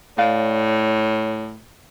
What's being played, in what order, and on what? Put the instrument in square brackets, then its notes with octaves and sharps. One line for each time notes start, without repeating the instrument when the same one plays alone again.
[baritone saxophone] A2 [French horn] C#5 [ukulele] D5 F5 G5